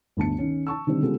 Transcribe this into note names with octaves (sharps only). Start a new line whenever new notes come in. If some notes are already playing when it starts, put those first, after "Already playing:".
G1 D2 A5 C#7
D#3 C#4
A5 C#6 E6
D3 D#3 G3 C4
C#3 G#3 B3 F4 G4 A4